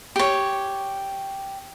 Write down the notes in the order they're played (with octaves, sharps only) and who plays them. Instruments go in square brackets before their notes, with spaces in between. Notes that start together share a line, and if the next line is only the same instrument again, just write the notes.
[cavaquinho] G4 C#5